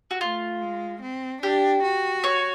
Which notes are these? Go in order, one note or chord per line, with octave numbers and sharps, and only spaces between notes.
F#4
A3 F4
G#3
C4
D4 G4
F#4
C#5